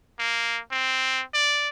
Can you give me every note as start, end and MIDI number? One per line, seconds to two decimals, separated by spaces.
0.19 0.61 58
0.72 1.23 60
1.34 1.69 74